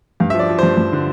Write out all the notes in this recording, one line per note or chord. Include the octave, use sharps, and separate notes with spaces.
G2 F5
F3 E5
D5
F3
G2 C5
G2
D3